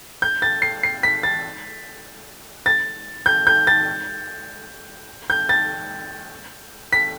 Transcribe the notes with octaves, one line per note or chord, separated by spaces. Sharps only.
G6
A6
C7
C7
B6
A6
A6
G6
G6
A6
G6
A6
B6